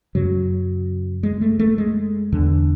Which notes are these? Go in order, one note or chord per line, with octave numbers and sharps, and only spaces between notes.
F#2 C#3 F#3
G#3
A3
A3
G#3
E2 D3